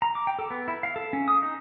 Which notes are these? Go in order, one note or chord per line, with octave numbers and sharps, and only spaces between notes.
A#5
D6
G5
A4
B3
E4
F5
A4
C#4
D#6
D#4